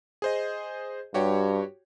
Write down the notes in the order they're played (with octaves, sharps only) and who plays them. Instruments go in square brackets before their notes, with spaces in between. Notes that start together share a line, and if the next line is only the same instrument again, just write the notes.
[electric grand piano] G#4 C5 D#5
[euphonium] G2 [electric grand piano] F#4 G4 C#5